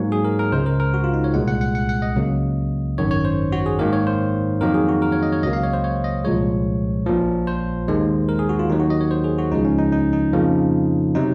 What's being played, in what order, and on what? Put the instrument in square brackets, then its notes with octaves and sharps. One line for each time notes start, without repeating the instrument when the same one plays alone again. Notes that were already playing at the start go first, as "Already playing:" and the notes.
Already playing: [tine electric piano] G#2 F#3 A#3 C#5
G#4
A#4
A#4
C#2 C#3 G#3 C5
A#4
A#4
F#4
F4
D#4
C#5
C2 A#2 G#3 F#5
F#5
F#5
F#5
F#5
D#5
C#2 C#3 F#3 A#3
G#1 F#2 D#3 C#5
C#5
C5
F#4
G#4
G#2 D#3 A#3 A#4
C#5
C5
F2 D#3 F#3 A#3 A#4
G#4
F#4
A#4
C#5
D#5
C#5
C#2 C#3 F#3 A#3 D#5
F5
C#5
C5
C#5
D#5
C2 A#2 F3 G#3 C#5
A#1 A#2 F3
C5
D#2 D#3 G#3
A#4
G#4
F#4
F4
D#2 D#3 F#3 D#4
F#4
D#5
C#5
C5
G#4
F#4
C#2 C#3 F3 G#3 D#4
C#4
D#4
D#4
D#4
F2 C#3 F3 A#3
C3 F#3 D#4